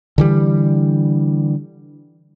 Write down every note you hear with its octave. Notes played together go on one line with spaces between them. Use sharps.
D3 E3 G3